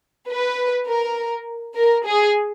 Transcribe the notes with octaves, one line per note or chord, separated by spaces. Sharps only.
B4
A#4
A#4
G#4